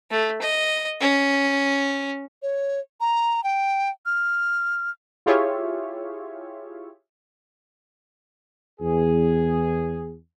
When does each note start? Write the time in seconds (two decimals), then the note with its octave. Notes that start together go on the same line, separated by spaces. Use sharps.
0.11 A3
0.42 D#5
1.01 C#4
2.42 C#5
3.01 A#5
3.44 G5
4.06 F6
5.26 E4 F4 G4 G#4 C#5 E5
8.80 E2 G#4